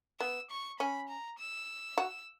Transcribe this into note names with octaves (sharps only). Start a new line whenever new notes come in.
B3 E6
C#6
C#4 B5
A#5
E6
F#4